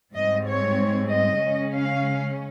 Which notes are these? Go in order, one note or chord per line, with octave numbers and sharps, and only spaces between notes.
G#2 G3 C4 D#5
C#5
D#5
C#3 G#3 C#4
F5